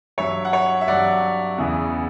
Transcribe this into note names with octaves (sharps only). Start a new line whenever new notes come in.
G2 F#3 C#5 E5
F#5
C#5 E5
E5
G2 F#3 D5 F#5
E2 C#3 E3